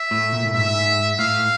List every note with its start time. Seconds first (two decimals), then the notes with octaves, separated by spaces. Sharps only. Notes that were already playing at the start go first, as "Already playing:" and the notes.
Already playing: E5
0.11 A2
0.33 A#2
0.47 A2
0.54 G#2 E5
1.19 A2 F5